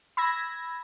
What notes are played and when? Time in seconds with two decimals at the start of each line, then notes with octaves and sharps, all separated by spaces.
0.17 B5 E6 G#6 A#6